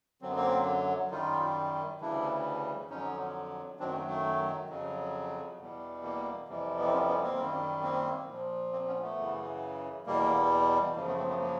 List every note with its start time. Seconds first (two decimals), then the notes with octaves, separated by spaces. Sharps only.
0.21 F#2 D3 F#3 C4
0.29 B3
0.36 A#3 C4
1.11 F#2 D#3 G3 D#4 F4
2.01 D2 C#3 E3 G3 D4 E4
2.90 F2 D3 F#3 C#4 D#4
3.80 F#2 D#3 F#3 C4 D4
3.91 A3
3.95 A#3
4.09 A3
4.69 F2 C#3 F#3
5.59 E2 B2 G3
6.04 A#3
6.48 F2 C3 E3 G3
6.79 B3
6.86 C4
6.93 B3 C#4
7.08 B3 C#4
7.23 A#3 C4
7.37 F#2 D#3 G3
7.83 A#3 C4
8.27 A#2 F3
8.72 A#3 C4
8.87 B3 C#4
9.02 A3 B3
9.17 F#2 C#3 E3
10.06 E2 B2 G3 A#3
10.96 F#2 C#3 F3 A#3
11.07 A3 B3
11.18 A#3 C4
11.29 A3 B3
11.41 A#3